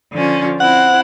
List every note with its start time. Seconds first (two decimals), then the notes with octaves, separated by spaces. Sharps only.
0.12 D3 F3 C#4
0.60 C4 E4 F#5